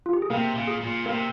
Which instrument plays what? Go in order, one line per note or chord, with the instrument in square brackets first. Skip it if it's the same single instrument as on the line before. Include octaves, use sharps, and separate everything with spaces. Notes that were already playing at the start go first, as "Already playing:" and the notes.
[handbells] F4
G4
G#4
[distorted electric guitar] C3 [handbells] A#3 A#4
[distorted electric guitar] A#2
[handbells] G#4
[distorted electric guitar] A#2
[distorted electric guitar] C3 [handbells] A#3 A#4